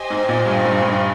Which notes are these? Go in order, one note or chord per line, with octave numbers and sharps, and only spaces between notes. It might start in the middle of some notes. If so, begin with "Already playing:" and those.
Already playing: G4 C5 D#5 G#5
G#2
A#2
G2
G2
G2